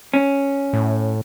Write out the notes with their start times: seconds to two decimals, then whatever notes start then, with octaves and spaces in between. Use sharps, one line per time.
0.14 C#4
0.73 A2